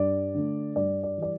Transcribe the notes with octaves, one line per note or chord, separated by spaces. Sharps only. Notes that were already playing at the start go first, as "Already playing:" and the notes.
Already playing: G2 D5
D3 A3
G2 D5
D5
E3 G3 D5